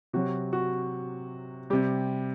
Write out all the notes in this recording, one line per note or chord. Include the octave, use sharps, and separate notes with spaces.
C3 F#3 F#4
F#4
C3 G3 G4